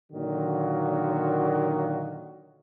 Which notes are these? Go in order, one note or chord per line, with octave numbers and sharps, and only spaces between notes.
A#2 D3 D#3 F#3 A#3 F#4